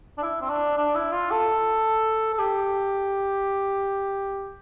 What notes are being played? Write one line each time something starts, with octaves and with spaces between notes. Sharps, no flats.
D4
E4
C4
D4
D4
E4
F4
A4
A4
G4